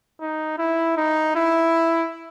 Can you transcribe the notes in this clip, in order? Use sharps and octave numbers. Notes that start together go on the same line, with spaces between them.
D#4
E4
D#4
E4